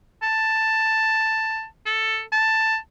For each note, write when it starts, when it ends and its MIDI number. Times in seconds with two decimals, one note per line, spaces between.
0.22 1.65 81
1.86 2.22 69
2.32 2.77 81